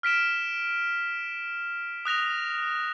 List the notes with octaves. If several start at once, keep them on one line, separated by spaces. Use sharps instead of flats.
F6 B6 D7 E7
D#6 F#6 A#6 F7